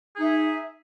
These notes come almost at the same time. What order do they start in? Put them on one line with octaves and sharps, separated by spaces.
G#4 D#4 E5